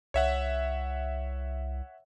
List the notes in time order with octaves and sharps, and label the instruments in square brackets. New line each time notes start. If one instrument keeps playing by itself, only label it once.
[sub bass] C2 [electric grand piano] C#5 E5 F#5